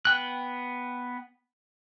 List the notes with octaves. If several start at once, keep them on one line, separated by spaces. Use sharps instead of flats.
B3 G5 F#6